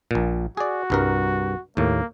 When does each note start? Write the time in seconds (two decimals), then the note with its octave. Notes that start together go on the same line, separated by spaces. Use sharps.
0.11 A#1 A#2
0.57 F#4 G#4 D5
0.90 C2 G2 A#4
1.77 D#2 A2 A#3